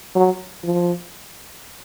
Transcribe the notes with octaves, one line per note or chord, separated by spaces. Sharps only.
F#3
F3